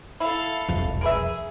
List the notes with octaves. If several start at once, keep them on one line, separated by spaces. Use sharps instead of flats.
E4 A4 F5
E1 C2 F2
G#4 A#4 B4 E5